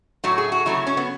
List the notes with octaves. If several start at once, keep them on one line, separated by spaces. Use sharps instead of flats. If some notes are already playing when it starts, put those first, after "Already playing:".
A2 F#3 A3 F#4
G#4
F#4
C#3 F#3 A3 E4
C#4
B3